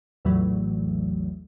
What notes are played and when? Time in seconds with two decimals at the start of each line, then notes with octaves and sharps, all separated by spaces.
0.25 A#1 E2 A2 E3 F#3 A3